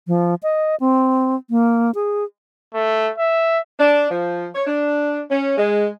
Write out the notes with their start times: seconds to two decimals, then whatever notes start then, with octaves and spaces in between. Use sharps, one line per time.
0.08 F3
0.43 D#5
0.80 C4
1.50 A#3
1.95 G#4
2.74 A3
3.18 E5
3.79 D4
4.09 F3
4.54 C#5
4.67 D4
5.30 C#4
5.57 G#3